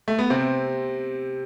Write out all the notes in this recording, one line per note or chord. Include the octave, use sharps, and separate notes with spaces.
A3
B3
C3 C4